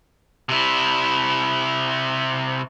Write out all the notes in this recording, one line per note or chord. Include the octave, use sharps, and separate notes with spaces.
C3 E4